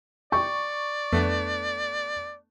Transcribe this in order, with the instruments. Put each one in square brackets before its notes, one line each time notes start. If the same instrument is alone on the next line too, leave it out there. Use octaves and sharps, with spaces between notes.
[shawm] D5 [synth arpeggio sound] G5 [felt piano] C#6
[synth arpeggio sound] F2 [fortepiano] A3 B3 D4